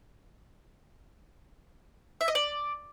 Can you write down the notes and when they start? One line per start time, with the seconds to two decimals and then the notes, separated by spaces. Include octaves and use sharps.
2.21 E5
2.28 D#5
2.35 D5